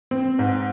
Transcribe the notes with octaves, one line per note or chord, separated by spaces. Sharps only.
C4
G#2